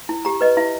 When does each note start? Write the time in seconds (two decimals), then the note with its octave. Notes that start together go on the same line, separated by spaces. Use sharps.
0.09 E4
0.25 G4 A#5
0.41 B4 D#5
0.57 E4 E5